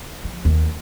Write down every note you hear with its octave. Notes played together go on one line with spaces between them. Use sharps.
F3
D#2